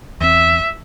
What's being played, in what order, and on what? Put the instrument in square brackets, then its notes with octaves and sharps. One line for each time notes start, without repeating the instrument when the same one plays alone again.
[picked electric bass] E2 C4 [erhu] E5